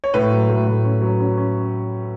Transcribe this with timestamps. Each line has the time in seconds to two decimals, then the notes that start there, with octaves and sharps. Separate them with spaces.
0.04 C#5
0.14 A2 B4
0.32 F#3
0.49 A2
0.67 A2
0.84 C#4
1.02 F#3
1.20 C#4
1.38 C#4